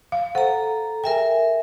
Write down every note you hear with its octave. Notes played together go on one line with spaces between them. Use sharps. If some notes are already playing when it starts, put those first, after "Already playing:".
F5
A4 C5 F#5 A#5
G#4 A#4 E5 G5 G#5